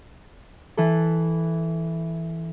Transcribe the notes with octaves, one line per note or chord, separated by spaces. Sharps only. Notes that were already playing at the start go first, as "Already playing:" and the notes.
E3 A4